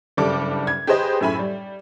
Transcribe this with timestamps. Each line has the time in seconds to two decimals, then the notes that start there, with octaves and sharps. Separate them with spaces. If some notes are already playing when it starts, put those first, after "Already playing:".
0.17 F#1 G2 G3 A4 D6
0.67 G#6
0.87 G4 G#4 B4 C5 D#5
1.21 F#2 A2 E5 G#5 B5
1.39 G3